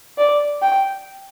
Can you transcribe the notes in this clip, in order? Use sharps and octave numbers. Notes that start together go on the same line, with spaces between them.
D5
G5